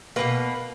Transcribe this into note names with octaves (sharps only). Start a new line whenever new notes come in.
B2 F#3 A#3 B4